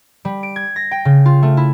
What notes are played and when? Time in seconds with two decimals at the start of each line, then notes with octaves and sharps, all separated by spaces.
0.25 G3
0.43 D7
0.56 G#6
0.76 A#6
0.91 G5
1.05 C#3
1.25 F4
1.43 A3
1.57 E4